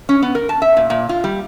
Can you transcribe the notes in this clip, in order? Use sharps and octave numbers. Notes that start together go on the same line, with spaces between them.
C#4
B3
A#4
A5
E5
A#2
A#2
F4
G3